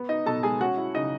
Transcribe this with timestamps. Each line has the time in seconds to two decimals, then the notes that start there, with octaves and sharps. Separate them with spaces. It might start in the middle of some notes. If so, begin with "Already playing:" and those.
Already playing: B3
0.09 D#4 D#5
0.26 B2 A4 A5
0.43 G#3 G#4 G#5
0.61 C#4 F#4 F#5
0.77 E4
0.94 C#3 D#4 D#5